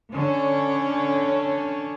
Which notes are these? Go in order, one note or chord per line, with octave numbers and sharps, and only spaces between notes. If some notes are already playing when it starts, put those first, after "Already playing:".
D3 C#4